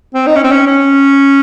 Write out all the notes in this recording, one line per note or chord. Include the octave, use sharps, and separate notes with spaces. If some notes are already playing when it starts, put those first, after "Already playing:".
C4
D#4
C#4
C4
C#4
C#4